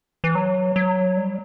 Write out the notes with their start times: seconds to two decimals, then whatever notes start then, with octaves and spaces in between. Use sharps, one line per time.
0.24 E3
0.35 F#3
0.76 F#3
1.17 G3